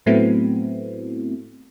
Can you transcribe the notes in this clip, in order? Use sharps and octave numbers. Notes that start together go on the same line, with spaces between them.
A2 F#3 A3 B3 C4 E4